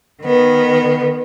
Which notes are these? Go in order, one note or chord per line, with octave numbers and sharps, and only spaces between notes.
D#3 B3